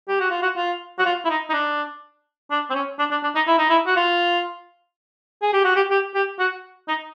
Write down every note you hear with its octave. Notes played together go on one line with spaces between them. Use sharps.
G4
F#4
F4
F#4
F4
F#4
F4
E4
D#4
D#4
D4
D4
C4
C#4
D4
D4
D4
D#4
E4
D#4
E4
F#4
F4
G#4
G4
F#4
G4
G4
G4
F#4
D#4